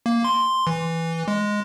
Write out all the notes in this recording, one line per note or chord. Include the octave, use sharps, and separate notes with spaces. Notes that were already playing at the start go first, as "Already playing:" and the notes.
A#3
C6
E3
G#3